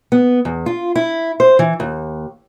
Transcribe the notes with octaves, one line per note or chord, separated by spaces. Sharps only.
B3
E2
F4
E4
C5
E3
D#2